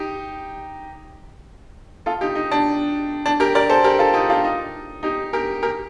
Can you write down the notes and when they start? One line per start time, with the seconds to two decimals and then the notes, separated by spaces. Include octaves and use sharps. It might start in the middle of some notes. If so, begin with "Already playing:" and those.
Already playing: D#4 G4
2.06 F4 A4
2.21 D#4 G4
2.35 D#4
2.51 D4
3.26 D4
3.40 G4 A#4
3.55 A#4 D5
3.69 A4 C5
3.84 G4 A#4
3.99 F4 A4
4.14 D#4 G4
4.30 D4 F4
4.45 D#4
5.03 D#4 G4
5.33 G4 A#4
5.63 G4 A#4